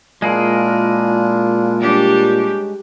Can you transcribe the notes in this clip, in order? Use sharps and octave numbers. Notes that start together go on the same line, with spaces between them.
A#2 G#3 D4 E4 F4 G#4 A#4
G3 C#4 D4 G4